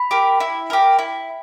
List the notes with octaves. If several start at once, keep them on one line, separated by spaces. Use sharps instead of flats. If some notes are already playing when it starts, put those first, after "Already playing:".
Already playing: B5
G4 A#4
E4
G4 A#4
E4